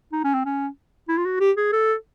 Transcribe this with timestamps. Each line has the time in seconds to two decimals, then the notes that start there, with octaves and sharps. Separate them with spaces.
0.12 D#4
0.24 C#4
0.34 C4
0.45 C#4
1.08 E4
1.17 F4
1.25 F#4
1.40 G4
1.57 G#4
1.72 A4